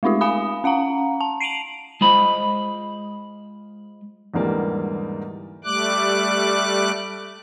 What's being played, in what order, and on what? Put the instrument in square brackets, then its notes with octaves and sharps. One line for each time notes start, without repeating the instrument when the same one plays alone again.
[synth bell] G#3 A3 D#4 F4 G4
F5 G#5 B5 D#6
C#4 F5 F#5 A#5
A5
C7 D7 D#7 F7 F#7
[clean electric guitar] G#3 F4 C5 D#5 B5
[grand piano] E2 G#2 D3 E3 G3 A#3
[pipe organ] G3 A3 D6 F#6